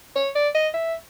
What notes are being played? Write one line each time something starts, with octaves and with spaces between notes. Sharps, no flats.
C#5
D5
D#5
E5